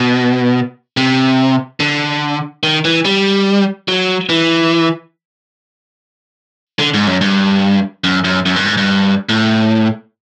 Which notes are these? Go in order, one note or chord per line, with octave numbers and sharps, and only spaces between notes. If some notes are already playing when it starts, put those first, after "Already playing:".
Already playing: B2
C3
D3
D#3
E3
G3
F#3
E3
D3
G#2
F#2
G2
F#2
F#2
F#2
G2
G#2
G2
A2